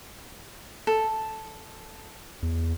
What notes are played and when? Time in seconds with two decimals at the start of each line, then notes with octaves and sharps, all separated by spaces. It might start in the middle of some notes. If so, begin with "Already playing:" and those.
0.87 A4
2.43 E2